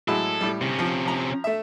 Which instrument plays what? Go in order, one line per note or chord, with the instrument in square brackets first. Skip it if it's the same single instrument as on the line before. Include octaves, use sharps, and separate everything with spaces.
[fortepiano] A2 F#3 G#3 [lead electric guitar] A4
[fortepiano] A2 G3
[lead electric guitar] C3 C#4
[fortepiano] F3
F3 A#5
A3 E5